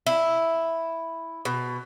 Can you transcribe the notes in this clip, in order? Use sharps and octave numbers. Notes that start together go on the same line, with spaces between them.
E4
B2